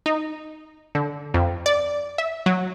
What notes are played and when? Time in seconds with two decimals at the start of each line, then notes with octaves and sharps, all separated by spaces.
0.06 D#4
0.95 D3
1.34 F2
1.66 D5
2.18 E5
2.46 F#3